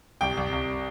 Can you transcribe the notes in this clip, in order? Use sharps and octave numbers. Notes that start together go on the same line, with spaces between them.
C2 G5
C2
C2